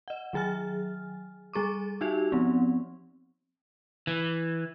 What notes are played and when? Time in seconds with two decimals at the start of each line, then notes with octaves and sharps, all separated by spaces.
0.08 D#5 F#5
0.33 D#3 F#3 G#4 G#5 F6
1.53 G3 G#4 C#6 D6
2.01 D#4 F#4 G4 E5
2.32 F3 B3 C4
4.07 E3